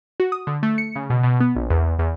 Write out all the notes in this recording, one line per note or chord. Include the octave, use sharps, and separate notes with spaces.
F#4
D#6
D3
A3
C#7
C#3
B2
B2
B3
A#1
E2
E2